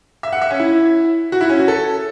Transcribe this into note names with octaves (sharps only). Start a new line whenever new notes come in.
E5
F#5
E5
C#4
E4
F#4
E4
C#4
F#4
A4